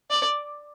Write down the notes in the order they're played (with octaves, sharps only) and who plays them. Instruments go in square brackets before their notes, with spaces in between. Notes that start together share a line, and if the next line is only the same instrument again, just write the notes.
[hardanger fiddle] D5